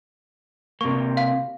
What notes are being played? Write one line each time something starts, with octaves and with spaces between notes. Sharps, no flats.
C3 A#3 C#6
F5